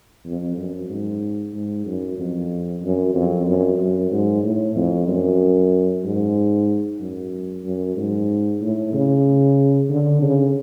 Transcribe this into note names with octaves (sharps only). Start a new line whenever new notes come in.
F2
F#2
G#2
G#2
F#2
F2
F#2
F2
F#2
F#2
G#2
A2
F2
F#2
G#2
F#2
F#2
G#2
A2
C#3
D3
C#3